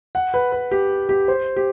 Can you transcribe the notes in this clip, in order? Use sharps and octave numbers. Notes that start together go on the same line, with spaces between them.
F#5
B4
B4
G4
G4
C5
G4